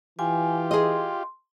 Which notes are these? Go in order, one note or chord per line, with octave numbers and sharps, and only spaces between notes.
E3 F4 G4 G#5
G#4 D#5 C6